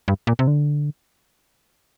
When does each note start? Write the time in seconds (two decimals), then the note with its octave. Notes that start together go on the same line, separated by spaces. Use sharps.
0.08 G2
0.27 A#2
0.39 C3
0.47 D3